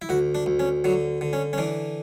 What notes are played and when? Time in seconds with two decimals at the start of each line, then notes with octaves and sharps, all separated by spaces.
0.02 E4
0.09 D2 F#4
0.35 D4
0.46 D2
0.60 C#4
0.84 D3 F#3
1.21 D3
1.33 C#4
1.53 C#4
1.58 E3 D4